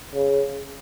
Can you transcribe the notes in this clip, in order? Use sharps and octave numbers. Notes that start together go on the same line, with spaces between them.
C#3